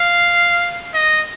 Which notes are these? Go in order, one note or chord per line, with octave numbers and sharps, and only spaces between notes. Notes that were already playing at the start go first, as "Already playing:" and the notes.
Already playing: F5
D#5